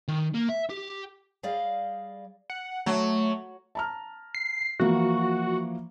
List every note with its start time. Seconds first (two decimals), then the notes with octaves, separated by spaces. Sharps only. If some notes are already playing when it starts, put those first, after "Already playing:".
0.08 D#3
0.34 A#3
0.49 E5
0.69 G4
1.43 G3 G#4 D5 D#5 F5
2.50 F#5
2.86 F#3 A3
3.75 A5 A#5 F6
4.35 C7
4.79 E3 F3 A#3 F#4